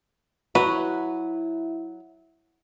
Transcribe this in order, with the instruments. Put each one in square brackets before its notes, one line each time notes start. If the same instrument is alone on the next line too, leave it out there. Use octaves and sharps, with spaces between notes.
[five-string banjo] F#3 F#4 [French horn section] E4 [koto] B4